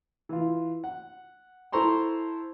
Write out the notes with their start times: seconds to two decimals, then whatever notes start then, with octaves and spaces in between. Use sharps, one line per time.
0.29 E3 F4
0.84 F#5
1.72 E4 A4 C5 A#5 C6 C#6